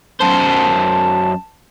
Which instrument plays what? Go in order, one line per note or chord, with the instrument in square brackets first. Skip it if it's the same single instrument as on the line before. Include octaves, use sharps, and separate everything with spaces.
[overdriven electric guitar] F#2 C5 [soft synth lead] A5